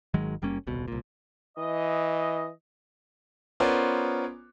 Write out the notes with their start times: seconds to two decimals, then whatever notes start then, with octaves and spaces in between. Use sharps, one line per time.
0.14 G#1 D#3 F#3 G#3
0.42 F#1 G3 A#3 C#4
0.67 D#1 C2 B2
0.88 C2 A#2
1.58 E3 D#5
3.60 B3 C#4 F4 A#4 C5 D5